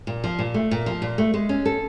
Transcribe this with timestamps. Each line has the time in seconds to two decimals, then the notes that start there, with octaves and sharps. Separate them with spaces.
0.07 A#2
0.24 F3
0.39 A#2
0.54 A3
0.71 A#2
0.86 F3
1.02 A#2
1.18 A3
1.34 G#3
1.49 C#4
1.66 A4